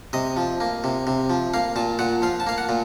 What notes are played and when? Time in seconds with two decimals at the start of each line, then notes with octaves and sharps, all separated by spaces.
0.13 C3 D#5
0.37 F3
0.60 A#3
0.84 C3
1.07 C3
1.30 F3
1.54 A#3 F5
1.76 A#2 A5
1.99 A#2 F#5
2.22 F3 F5
2.40 A5
2.47 A#3 F5
2.58 F#5
2.69 A#2